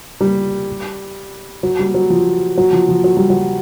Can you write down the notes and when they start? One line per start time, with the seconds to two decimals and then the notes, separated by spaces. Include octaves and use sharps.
0.21 G3
1.63 F#3
1.79 G3
1.95 F#3
2.10 F3
2.58 F#3
2.73 F3
2.89 F3
3.04 F#3
3.17 G3
3.30 F#3